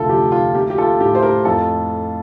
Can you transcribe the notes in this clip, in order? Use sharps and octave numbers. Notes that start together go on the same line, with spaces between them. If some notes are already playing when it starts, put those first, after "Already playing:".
Already playing: F1 D2 F4 A4
F3 G4
F4
A#3 G4
G4
F4 A4
A2 G4
C5
G4 A#4
F2 F4 A4